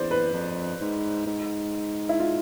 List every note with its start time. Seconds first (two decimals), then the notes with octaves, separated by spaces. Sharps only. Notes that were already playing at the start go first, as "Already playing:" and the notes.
Already playing: E2 C5 D5
0.11 B4
0.33 F2
0.81 G#2
1.26 G#2
2.09 E4
2.20 F4